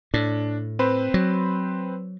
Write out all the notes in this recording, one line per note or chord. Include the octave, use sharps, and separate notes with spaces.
A2 D4
C4 B4 C5
F#3